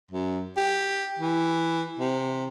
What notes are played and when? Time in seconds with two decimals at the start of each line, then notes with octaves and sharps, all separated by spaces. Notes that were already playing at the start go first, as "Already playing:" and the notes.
0.11 F#2
0.57 G4
1.19 E3
1.99 C3